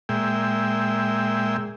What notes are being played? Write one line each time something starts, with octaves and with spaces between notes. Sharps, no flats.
A#2 G#3 E5 G5